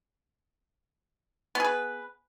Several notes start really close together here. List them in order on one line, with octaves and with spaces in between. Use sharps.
B3 G#4 B4